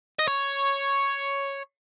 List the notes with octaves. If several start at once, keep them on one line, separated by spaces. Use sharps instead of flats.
D#5
C#5